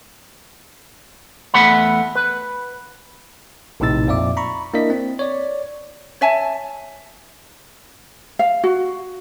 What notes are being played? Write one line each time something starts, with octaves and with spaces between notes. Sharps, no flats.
E2 A3 F#5 B5
B4
A#1 A2 C3 D#4 E6 A6
F2 A#2 D5 E5 D6
A#5 B5 C#6
A#3 D4 E4 A#4 D#5 B6
C4
C#5 D5
C#5 E5 G#5 A5
F5
F#4